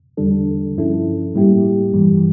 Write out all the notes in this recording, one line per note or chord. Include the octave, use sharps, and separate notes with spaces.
E2 D3 G3 D4 A4
G2 F3 C#4 E4 A4
A2 G3 A#3 E4 G4
G2 E3 G3